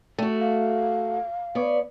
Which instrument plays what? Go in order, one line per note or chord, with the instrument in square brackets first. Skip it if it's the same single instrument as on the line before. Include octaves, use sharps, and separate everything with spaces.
[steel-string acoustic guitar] A3 F#4
[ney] F5
[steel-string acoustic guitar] B3 C#5 D5